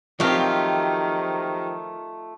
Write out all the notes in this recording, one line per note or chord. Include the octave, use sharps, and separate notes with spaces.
D#3 F3 F#3 A3 C4 F4 G4 A#4